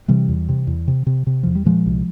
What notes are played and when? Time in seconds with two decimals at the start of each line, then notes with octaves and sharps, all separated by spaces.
0.08 C3 E3 G3
0.28 E2
0.49 C3
0.67 E2
0.88 C3
1.06 C3
1.27 C3
1.43 E2 F3
1.55 G3
1.65 A#2 F3 G#3
1.86 C2